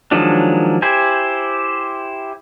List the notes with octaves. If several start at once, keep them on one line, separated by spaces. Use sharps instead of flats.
D#3 F3 F#3 G#3 D4
E4 G4 C5 G#5